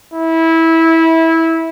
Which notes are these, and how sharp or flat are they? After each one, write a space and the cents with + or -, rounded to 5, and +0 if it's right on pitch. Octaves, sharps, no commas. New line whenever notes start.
E4 -20